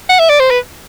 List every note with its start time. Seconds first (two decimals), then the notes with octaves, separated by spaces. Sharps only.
0.09 F#5
0.19 E5
0.30 D5
0.39 C5
0.51 B4